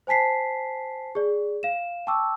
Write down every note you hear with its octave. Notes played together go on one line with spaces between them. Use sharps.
C5 G#5 A5 B6 C7
G#4 D5
F5 E7
G5 A5 C#6 D6 E6